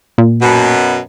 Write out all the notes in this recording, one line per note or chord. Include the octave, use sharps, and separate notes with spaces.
A#2
F#2 B2